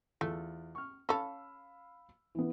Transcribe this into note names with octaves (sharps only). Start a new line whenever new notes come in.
E2 A3 F4
C#6 F6
C#4 A4 F5 B5 E6
E3 B3